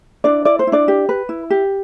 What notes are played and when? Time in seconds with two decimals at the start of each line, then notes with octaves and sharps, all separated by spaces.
0.24 D4 E4 D5
0.45 E4 D5
0.59 C5
0.67 E4
0.72 D4 D5
0.88 G4
1.09 B4
1.29 E4
1.50 G4